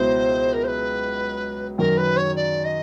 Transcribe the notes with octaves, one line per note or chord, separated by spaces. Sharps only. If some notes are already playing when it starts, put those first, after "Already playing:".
Already playing: C#2 B2 F#3 B3 E4 C5
A#4
C5
B4
F#2 D#3 F#3 A#4
B4
C#5
D5
D#5